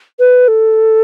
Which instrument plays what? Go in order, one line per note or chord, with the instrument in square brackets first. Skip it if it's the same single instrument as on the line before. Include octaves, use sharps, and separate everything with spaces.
[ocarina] B4
A4